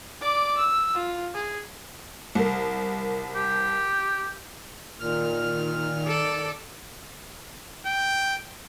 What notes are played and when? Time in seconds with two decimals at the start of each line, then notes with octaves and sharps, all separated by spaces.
0.21 D5 D6
0.57 E6
0.95 F4
1.34 G#4
2.35 C2 A#4
3.35 G4
5.00 A#2 D#3 F6
6.06 A4 D5
7.86 G5